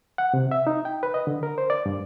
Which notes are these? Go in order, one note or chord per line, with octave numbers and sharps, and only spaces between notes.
F#5
C3
E5
D#4
G5
B4
D#5
D3
A#4
C5
D5
G2